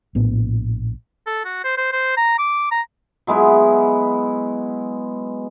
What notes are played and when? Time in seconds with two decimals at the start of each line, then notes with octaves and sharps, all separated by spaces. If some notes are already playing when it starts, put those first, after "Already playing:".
0.15 A#1 A2 B3
1.27 A4
1.45 F#4
1.64 C5
1.78 C5
1.92 C5
2.17 A#5
2.39 D6
2.71 A#5
3.27 F#3 G#3 B3 E4